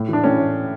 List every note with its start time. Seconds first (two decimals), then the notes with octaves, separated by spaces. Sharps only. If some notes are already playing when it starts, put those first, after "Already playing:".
Already playing: A2
0.08 E3 D4
0.23 A2 C#4